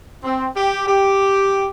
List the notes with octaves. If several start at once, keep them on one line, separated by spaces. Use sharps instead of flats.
C4
G4
G4